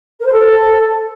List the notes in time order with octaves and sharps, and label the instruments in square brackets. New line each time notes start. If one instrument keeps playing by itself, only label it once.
[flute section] A#4
C5
A4